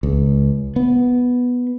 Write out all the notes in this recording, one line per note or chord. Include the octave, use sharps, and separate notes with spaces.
C#2
B3